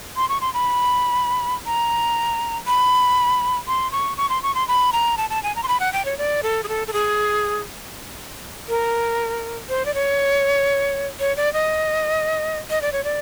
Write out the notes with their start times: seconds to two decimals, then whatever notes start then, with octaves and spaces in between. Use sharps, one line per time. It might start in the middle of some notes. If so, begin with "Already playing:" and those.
0.17 C6
0.29 C#6
0.41 C6
0.54 B5
1.66 A#5
2.67 B5
3.68 C6
3.92 C#6
4.17 C#6
4.29 C6
4.43 C#6
4.55 C6
4.68 B5
4.93 A#5
5.17 A5
5.30 A5
5.43 G#5
5.56 A#5
5.63 C6
5.68 B5
5.80 F#5
5.93 G5
6.05 C#5
6.18 D5
6.43 A4
6.64 G#4
6.68 A4
6.88 A4
6.93 G#4
8.69 A#4
9.69 C5
9.85 D5
9.94 C#5
11.20 C#5
11.37 D5
11.53 D#5
12.70 D#5
12.82 D5
12.92 C#5
13.04 D5